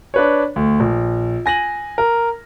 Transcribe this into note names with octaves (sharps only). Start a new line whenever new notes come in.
D4 B4 C#5
D2
A#1
G#5 A#6 D#7 F#7
A#4